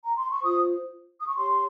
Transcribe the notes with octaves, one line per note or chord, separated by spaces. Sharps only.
A#5
C6
C#6
F4 C5 D#6
D#6
C#6
G4 C#5 C6